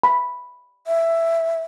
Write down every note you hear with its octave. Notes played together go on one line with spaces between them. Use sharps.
B5
E5